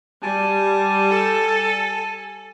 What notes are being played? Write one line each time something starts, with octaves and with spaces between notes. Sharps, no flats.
G3 G#5 A5
A4